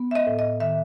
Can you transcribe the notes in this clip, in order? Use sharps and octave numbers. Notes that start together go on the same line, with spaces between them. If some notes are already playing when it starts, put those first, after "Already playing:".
Already playing: B3
E5
D#5
A2
D#5
D#3 E5